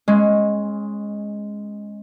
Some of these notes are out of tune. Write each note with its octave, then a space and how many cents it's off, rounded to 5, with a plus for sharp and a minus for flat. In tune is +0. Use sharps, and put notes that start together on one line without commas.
G#3 +0 C#4 -20